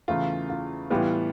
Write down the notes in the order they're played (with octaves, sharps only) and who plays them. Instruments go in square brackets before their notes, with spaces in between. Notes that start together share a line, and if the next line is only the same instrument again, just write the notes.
[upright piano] E2 C#3 E3 A3 F4
F4
A2 E3 G3 B3 F4